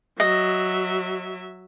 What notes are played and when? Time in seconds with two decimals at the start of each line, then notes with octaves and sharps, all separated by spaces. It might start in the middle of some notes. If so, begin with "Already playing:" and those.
0.20 F#3 D#5 E5